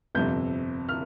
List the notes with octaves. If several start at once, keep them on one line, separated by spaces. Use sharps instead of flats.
G1 F2 C3 G6
F6